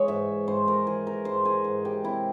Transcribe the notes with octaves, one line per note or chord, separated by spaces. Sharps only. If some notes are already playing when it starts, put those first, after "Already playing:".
Already playing: E3 G#3 G#4 C#5
G#2 E5
G#2 C5
A#4
E3 G#4
A#4
G#2 C5
G#4
G#2
G4
C3 E4